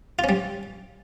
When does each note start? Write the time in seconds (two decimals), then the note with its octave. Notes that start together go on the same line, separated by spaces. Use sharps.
0.19 F4
0.24 C#4
0.29 G3